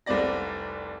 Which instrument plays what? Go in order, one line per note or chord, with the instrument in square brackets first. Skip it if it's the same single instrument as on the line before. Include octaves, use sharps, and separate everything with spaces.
[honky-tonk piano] F1 C2 C4 C5 D5 A#6